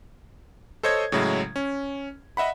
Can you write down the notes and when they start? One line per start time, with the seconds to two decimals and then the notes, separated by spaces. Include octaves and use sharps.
0.83 A4 C5 C#5 D#5 D#6 G#6
1.12 A2 C#3 F#3 G#3 E4
1.56 C#4
2.37 D#5 E5 F#5 B5